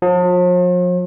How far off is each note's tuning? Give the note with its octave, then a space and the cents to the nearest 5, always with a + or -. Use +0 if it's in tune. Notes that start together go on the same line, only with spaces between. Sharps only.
F3 +45